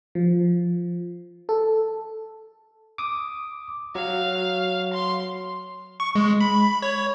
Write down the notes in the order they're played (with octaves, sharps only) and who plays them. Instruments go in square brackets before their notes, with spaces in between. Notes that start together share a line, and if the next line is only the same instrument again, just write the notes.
[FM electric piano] F3
A4
[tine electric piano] D6 D#6
[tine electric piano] F#3 [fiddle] F5
[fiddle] C6
[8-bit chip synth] C#6
G#3
B5
C#5